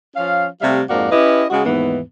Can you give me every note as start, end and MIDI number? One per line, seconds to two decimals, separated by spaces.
0.16 0.47 53
0.16 0.47 61
0.16 0.47 77
0.62 0.81 48
0.62 0.81 55
0.62 0.81 57
0.62 0.81 76
0.62 0.81 77
0.89 1.08 41
0.89 1.08 44
0.89 1.08 58
0.89 1.08 66
0.89 1.08 74
1.11 1.44 61
1.11 1.44 64
1.11 1.44 67
1.11 1.44 71
1.11 1.44 75
1.50 1.62 49
1.50 1.62 56
1.50 1.62 66
1.65 2.01 39
1.65 2.01 44
1.65 2.01 52
1.65 2.01 59